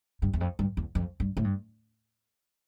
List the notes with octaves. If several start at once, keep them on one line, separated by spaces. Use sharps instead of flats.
G2
E2
F2
G2
E2
F2
G2
A2
G2